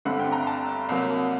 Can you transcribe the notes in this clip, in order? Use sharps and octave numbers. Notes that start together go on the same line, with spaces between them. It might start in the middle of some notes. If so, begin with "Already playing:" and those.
G1 G2 D3 A3 C4 F#5
G5
A#5
A5
C2 C3 F#3 A#3